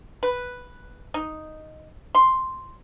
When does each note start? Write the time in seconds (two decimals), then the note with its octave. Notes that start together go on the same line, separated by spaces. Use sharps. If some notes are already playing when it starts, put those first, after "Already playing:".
0.23 B4
1.14 D#4
2.15 C6